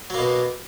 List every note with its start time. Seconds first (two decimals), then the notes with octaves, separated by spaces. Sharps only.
0.10 F#3
0.14 A#3
0.18 B2